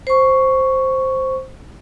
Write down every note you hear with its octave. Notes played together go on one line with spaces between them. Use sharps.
C5 C#6